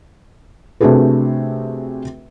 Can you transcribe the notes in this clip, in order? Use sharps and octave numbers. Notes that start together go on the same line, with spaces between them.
C3 A3 D4 F#4 G#4 B4